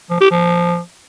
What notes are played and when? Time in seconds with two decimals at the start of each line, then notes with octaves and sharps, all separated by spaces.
0.10 F3
0.21 G4
0.31 F3